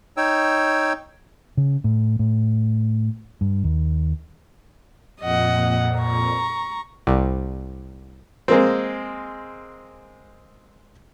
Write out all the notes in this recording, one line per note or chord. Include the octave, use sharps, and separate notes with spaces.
D#4 C#5 G5 E6
C#3
A2
A2
G2
D#2
F2 A#2 D#5 F#5
A#5 C#6
C2
G#3 A#3 C4